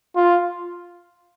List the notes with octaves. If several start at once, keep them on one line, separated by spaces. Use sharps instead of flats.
F4